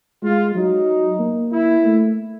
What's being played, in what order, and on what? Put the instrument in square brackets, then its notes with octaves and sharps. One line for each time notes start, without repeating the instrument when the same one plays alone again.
[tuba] G#3 [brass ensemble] F4
[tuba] F#3 [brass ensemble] D#4
[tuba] A#3
[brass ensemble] E4
[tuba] A3